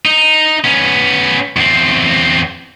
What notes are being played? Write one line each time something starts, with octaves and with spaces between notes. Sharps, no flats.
D#4
B3 C#4
E2 C4